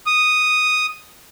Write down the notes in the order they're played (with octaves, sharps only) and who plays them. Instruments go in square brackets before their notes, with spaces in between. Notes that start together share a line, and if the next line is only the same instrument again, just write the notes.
[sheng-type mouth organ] D#6